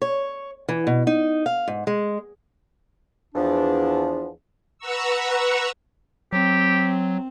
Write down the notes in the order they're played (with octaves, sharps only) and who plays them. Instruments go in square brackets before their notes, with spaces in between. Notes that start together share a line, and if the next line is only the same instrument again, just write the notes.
[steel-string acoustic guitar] C#5
E3
B2
D#4
F5
G#2
G#3
[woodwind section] E2 F3 D4
[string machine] B4 F#5 A#5 C#6 E6
[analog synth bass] F#3 [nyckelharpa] C4 [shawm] G4